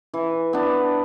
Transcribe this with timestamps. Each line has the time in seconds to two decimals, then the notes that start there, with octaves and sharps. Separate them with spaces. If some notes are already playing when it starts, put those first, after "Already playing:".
0.14 E3
0.53 B3 D4